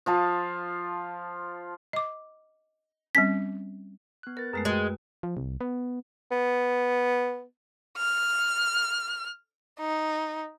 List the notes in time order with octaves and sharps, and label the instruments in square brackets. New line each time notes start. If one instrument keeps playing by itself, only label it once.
[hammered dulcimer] F3 F4 A5
[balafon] D#5 D6
[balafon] G3 C4 C#4 [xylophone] B6
[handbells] B3 F#6
[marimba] A#4 [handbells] B4 A6
[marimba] F#2 G#3 A3 [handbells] G#4 A#4 B4
[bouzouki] G#3 [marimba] F#4 G5
[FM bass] F3
C2
B3
[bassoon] B3
[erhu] F6
D#4